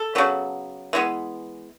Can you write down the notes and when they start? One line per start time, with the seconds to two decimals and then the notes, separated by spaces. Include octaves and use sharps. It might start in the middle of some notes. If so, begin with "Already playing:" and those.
Already playing: A4
0.15 C#3 F#3 B3
0.93 E3 G#3 B3